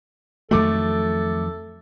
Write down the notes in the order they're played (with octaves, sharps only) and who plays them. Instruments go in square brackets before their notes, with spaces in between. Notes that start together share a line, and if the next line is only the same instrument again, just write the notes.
[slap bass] F2 D#3 F#3 [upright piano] A3 D6 [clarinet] A4